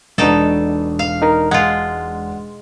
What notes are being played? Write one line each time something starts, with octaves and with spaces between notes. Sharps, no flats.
E1 B2 D4 D#4 A4
F5
D#4 A#4
G#3 F4 F#5